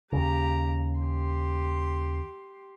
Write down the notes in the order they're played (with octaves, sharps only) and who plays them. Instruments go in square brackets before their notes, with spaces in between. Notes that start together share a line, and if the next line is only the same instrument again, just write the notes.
[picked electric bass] D#2 C#3 [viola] G4 A#5
[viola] G4 C6